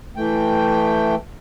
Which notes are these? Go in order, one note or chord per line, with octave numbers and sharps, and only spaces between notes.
E3 A3 G5